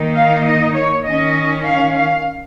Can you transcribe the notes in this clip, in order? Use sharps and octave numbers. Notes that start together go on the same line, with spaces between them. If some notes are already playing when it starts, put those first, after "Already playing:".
Already playing: D#3 A#3 D#4
F5
D#5
C#5
D#3 C#4 D#5
F5
F5